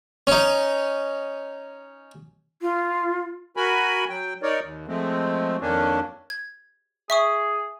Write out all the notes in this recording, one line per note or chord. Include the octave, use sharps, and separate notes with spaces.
C#4 D#4
F4
F#4 A#4 G#5 B5
F#3 G5
D#4 A#4 C#5 D5
D#2
F3 G#3 A3 C4
F2 D#3 A#3 C#4 D4
G#6
G#4 E5 C#6 D#6